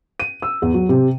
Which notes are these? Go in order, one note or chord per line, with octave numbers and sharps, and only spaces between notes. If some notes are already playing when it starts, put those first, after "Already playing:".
D#7
E6
E2
F#3
C3